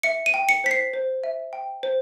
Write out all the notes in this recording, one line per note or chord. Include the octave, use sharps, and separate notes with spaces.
E5 C#7
D#7
G5
C#7
C5 B6
C7
C5
E5
G5
C5